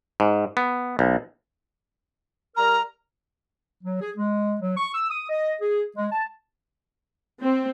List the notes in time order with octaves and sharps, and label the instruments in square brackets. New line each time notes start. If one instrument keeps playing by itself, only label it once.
[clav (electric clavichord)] G#2
B3
B1
[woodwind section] G3 A#4 F6 [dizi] A#5
[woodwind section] F#3
G#4
G#3
F#3
C#6
E6
D#6
D#5
G#4
G#3
A5
[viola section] C4